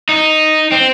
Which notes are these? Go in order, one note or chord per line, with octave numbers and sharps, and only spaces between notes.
D#4
C4